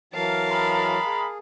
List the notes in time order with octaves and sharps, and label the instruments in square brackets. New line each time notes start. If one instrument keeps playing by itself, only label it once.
[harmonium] E3 F#3 [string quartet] A#4 F5 A5
[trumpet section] G#3 A#5 B5
[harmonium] G#4